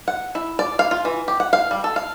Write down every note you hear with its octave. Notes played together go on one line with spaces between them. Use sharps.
F#5
E4
D5
F5
F4
E3
G4
F#5
F5
G3
A4
F5